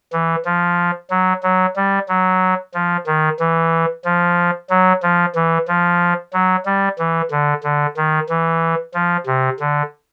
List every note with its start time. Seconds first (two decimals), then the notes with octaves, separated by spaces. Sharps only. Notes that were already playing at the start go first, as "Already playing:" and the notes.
0.13 E3
0.45 F3
1.10 F#3
1.43 F#3
1.76 G3
2.08 F#3
2.74 F3
3.07 D#3
3.40 E3
4.05 F3
4.70 F#3
5.02 F3
5.35 E3
5.68 F3
6.33 F#3
6.66 G3
6.99 E3
7.31 D3
7.64 D3
7.97 D#3
8.29 E3
8.94 F3
9.27 C3
9.60 D3